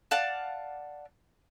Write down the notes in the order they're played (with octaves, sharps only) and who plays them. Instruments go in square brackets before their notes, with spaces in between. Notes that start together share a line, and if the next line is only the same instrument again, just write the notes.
[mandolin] D5 F5 F#5 A5